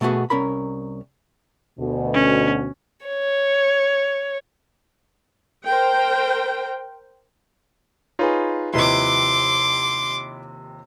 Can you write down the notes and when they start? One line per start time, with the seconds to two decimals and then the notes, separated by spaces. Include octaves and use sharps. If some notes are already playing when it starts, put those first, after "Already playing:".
0.01 B2 A3 B3 F#4 G#4
0.30 C2 C#4 A#4 B5
1.79 D2 B2
2.14 C#4
3.06 C#5
5.68 A#4 C5 G5
8.19 D#4 F4 G#4 B4 C#5
8.74 D#2 C3 F3 E4 B4 D#5 C6 D6